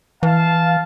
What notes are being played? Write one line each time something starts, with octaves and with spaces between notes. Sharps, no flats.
E3 F5 A5